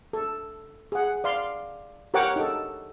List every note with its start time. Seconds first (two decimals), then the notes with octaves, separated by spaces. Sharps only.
0.13 A4
0.92 G#4 F#5
1.24 D5 F5 C6
2.14 G4 A#4 C#5 F#5 G5 D6
2.36 D#4 A4